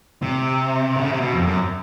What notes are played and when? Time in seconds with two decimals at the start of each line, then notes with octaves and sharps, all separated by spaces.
0.22 C3
0.96 D3
1.04 C#3
1.13 C3
1.21 B2
1.33 F2
1.47 F#2